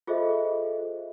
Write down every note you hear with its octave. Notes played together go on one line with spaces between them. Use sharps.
F4 G#4 A4 C5 D#5 E5